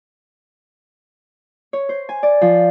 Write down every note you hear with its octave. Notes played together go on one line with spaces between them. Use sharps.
C#5
C5
G#5
D5
F3